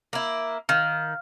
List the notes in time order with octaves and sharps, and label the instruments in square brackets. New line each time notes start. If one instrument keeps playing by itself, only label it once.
[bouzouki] A#3 E4
[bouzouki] D#3 [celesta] F5 F6